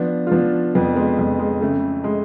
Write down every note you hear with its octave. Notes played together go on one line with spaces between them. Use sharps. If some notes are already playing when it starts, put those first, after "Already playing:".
Already playing: F3 B3 D4
F4
F3 B3 D4
F2 B3 D4
G#3 B3
F2
G#3
C#3 A3
G#3